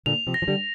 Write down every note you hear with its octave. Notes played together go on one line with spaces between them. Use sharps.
A#2 D3 F7
C3 F3
A#6
F3
D3 G3